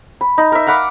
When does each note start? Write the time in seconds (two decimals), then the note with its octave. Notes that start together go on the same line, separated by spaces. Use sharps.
0.21 B5
0.38 D#4
0.52 A#4 E5
0.67 F5 F#5 B5 D6